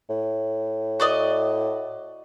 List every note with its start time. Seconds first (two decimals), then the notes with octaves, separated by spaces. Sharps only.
0.10 A2
1.00 F#4 D5 D#5